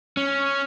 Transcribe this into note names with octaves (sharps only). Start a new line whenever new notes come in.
C#4